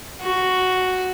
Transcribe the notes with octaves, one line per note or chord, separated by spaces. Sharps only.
F#4